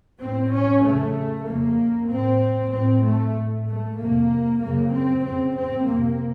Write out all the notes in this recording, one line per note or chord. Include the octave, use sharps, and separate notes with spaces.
A2 C4
C#4
F2 C#3 A3
F2 C#3 A#3
A2 C4
A2 C4
A3
A2
A3
F2 C3 A#3
F#2 C#3 A#3
C4
F2 C#3 C4
C4
F2 C3 A#3